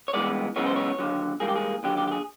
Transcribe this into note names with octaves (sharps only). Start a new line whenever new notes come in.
C#5
G2 E3 G#3 B3 D5
F#2 C#3 E3 G#3 B3 C#5
C5
C#5
D#2 D3 F#3
G#2 E3 G3 A#3 G#4
G4
G#4
D#2 D3 F#3 G4
G4
G4
G#4